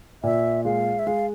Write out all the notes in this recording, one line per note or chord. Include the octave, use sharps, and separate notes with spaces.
A#2 E5
G#3 F5
E5
G#3 F5